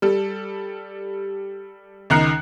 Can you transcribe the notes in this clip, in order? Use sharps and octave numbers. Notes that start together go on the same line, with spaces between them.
G3 A4
C#2 D#3 A#5 F#6 C7 C#7